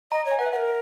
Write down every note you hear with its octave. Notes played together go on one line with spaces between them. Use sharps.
D#5 A#5
C#5
G#5
B4 F#5
E5
A#4 B4 F#5